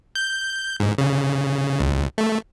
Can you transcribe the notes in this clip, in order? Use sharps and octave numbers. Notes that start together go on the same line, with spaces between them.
G6
G#2
C#3
C#2
A3